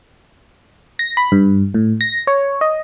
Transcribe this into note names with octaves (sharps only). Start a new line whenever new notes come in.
A#6
B5
G2
A2
A#6
C#5
D#5